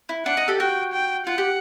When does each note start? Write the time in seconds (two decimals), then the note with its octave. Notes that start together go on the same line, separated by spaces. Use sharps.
0.09 E4
0.26 D4 F#5
0.37 D#4
0.48 G4 A4
0.59 F#4 G5
0.93 G5
1.26 F4 F#5
1.38 G4